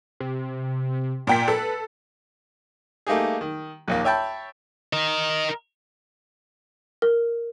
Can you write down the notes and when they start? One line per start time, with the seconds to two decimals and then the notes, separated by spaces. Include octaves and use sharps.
0.20 C3
1.27 A#2 G5 B6
1.48 A4 B4
3.07 A3 A#3 D#4 G4 G#4
3.41 D#3
3.88 A#1 D#2 A#3
4.04 C#5 E5 G5 A5 B5
4.93 A#4 D#5
7.02 A#4